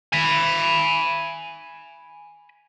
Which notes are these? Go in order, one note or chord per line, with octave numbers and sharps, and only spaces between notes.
G#5 B5